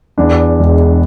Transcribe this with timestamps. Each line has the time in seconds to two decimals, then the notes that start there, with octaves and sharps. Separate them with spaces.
0.18 E2 D4
0.59 E1